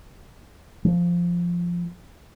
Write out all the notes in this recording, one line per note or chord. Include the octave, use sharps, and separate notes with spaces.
F3